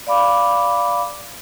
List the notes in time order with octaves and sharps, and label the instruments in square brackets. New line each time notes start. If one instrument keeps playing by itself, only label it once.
[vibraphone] D5 F5 B5 D6